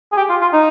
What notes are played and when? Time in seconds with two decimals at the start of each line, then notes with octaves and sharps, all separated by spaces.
0.12 G#4
0.17 G4
0.30 F4
0.41 F4
0.53 D#4